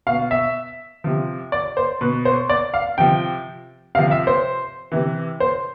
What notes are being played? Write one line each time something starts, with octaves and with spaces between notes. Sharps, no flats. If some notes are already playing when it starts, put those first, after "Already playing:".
B2 F5
E5
C3 F3
D5
C5
B2 B4
C5
D5
F5
C3 F3 G5
C3 F3 F5
E5
C5
C3 E3
C5